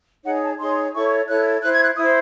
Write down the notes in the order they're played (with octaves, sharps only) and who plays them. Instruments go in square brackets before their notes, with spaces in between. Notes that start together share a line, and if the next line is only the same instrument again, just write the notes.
[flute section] D#4 G#4 C#5 F#5
A5
D#4 G#4 C#5 C6
E4 A4 C#5 C#6
E4 A4 C#5 F#6
E4 C5 F#6
G#6
F#6
E4 D#6
C5